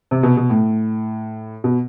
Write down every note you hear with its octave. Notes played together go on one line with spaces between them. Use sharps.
C3
B2
B2
A2
B2